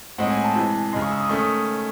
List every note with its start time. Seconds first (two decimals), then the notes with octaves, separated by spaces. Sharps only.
0.18 A2 G#3 C4 D#4 F#5
0.30 G#5
0.44 A5
0.55 C3 E3 G#3
0.93 C#3 G#3 D#4 C6
1.02 C#6
1.11 E6
1.21 D#6
1.29 D#3 A3 C#4 C#6
1.39 D#6